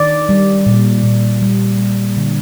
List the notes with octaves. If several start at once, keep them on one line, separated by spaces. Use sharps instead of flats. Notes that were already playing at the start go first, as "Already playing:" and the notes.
Already playing: D#3 D5
G3
A#2
A#2
G3
A#3
D3